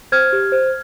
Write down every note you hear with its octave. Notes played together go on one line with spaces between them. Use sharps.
C5 F6 G#6
G4
C5